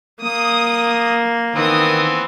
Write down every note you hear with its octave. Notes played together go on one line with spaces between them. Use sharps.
A#3 D#6
D#3 E3 B3 C4 D#6